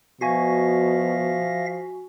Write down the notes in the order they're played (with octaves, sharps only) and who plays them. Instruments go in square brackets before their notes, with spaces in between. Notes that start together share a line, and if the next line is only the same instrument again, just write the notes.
[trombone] B2 [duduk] F3 [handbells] F#4 G#5 C#6 [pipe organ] E5 F5 A#6